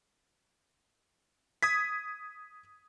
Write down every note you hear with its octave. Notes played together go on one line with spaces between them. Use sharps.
D#6 G#6 B6